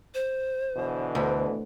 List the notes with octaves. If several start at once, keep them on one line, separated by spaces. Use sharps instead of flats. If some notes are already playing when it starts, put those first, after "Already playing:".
C5
B2 D3 E3
D2